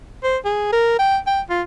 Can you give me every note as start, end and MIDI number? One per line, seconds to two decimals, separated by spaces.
0.24 0.37 72
0.45 0.71 68
0.73 0.98 70
0.99 1.18 79
1.27 1.41 79
1.50 1.62 65